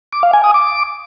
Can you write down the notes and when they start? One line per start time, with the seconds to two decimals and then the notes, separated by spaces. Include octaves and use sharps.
0.13 D6
0.23 F5
0.33 G#5
0.44 D#6
0.54 D6